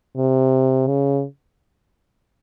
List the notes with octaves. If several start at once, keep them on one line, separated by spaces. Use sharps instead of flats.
C3
C#3